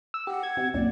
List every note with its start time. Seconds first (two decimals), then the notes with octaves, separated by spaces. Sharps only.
0.14 E6
0.27 G4 F#5
0.43 G#6
0.57 C3
0.74 C2 F#2 A#2 D5